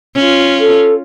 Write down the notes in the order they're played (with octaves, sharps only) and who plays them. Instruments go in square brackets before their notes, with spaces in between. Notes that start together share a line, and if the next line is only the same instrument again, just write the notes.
[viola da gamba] C#4 F4
[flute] A4